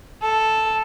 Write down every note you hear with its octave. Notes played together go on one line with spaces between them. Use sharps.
A4